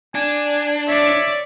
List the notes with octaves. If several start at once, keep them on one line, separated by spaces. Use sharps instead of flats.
D4 G#5
C#5 D5 E5